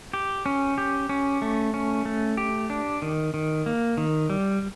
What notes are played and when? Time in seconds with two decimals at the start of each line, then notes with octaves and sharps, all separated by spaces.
0.14 G4
0.46 C#4
0.78 G4
1.09 C#4
1.42 A3
1.74 C#4
2.05 A3
2.37 G4
2.70 D4
3.02 D#3
3.34 D#3
3.66 A#3
3.97 D#3
4.30 G3